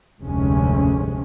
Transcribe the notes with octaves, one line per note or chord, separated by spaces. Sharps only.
F1 D2 G#2 C3 G#3 C#4